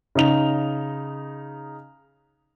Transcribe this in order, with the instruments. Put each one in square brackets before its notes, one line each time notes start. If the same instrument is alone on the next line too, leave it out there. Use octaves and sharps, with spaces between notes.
[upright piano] C#3 D#4 F7